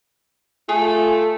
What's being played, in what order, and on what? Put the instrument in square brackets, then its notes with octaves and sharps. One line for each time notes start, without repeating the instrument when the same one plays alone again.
[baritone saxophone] A3 [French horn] F4 [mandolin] G#4